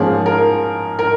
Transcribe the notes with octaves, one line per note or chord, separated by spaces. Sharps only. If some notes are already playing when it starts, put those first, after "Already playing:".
Already playing: G#2 F3 A#3 C#4 G#4
A#4
A#4